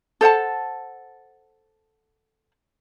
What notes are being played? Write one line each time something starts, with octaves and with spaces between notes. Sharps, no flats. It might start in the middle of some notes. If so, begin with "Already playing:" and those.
A4 C5 F#5 A5